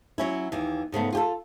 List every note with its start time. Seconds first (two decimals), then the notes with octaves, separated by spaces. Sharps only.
0.18 F#3 C#4 E4
0.52 D#2 E3
0.92 G#2 C#3 A3 B3
1.13 F4 G4 A4